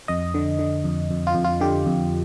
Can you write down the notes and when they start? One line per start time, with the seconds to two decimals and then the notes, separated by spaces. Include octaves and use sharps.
0.08 F2 D#5
0.34 D3
0.59 D3
0.84 F2
1.11 F2
1.27 F4
1.35 F2
1.44 F4
1.61 D3 G4
1.86 F2